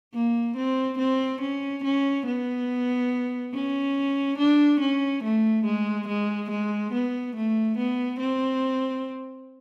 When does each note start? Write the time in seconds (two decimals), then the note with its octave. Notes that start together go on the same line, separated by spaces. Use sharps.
0.14 A#3
0.57 C4
0.98 C4
1.41 C#4
1.84 C#4
2.27 B3
3.54 C#4
4.38 D4
4.80 C#4
5.24 A3
5.65 G#3
6.08 G#3
6.50 G#3
6.93 B3
7.36 A3
7.78 B3
8.19 C4